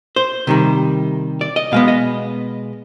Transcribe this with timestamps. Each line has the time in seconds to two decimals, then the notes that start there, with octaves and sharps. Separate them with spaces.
0.16 C5
0.47 C3 D#3 G3
1.41 D5
1.56 D#5
1.72 B2 G#3 B3 F5
1.88 D#5